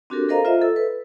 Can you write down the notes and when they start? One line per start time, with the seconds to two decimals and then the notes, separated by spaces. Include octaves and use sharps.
0.10 C4 D4 F#4 G4 A4 A#4
0.29 A4 A#4 C5 D#5 F5 A#5
0.45 F4 C5 D#5 E5
0.62 A4 E6
0.76 B4